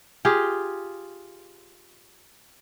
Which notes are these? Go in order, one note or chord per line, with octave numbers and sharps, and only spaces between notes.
F4 G4 G#4